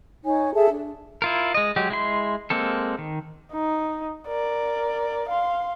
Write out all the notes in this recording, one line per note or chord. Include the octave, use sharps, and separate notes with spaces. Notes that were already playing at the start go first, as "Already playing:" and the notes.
D#4 C#5 G#5
G#4 A4 E5 A5
D4
E4 F4 A#4
G#3 D#5
F#3 G#3 G4
G#3 E4 C6
G#3 A#3 C4 A4
D#3
D#4
A#4 D5
F5 C6